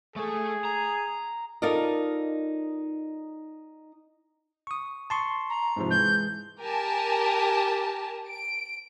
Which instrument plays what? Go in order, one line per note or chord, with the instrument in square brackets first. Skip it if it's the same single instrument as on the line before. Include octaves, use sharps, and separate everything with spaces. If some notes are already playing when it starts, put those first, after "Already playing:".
[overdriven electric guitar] A3 A4 [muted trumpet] G#4
[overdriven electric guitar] A#5
[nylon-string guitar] D#4 F4 A4 A#4 D5 D#5
[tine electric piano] C#6 D#6
A5 C6 C#6
[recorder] A#5
[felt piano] G#2 C3 F3
[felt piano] E3 G#3 [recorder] G6
[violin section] G4 A#4 G#5 A5
D7